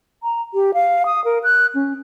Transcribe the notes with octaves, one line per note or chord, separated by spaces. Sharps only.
A#5
G4
F5
D#6
A#4
F#6
C#4